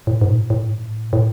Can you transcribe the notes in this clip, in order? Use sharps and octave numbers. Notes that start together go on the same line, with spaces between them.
A2
G#2
A#2
A2
A2
G#2
A2
A2